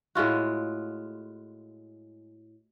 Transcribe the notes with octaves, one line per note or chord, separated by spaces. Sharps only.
A2 G#3 F4 F#4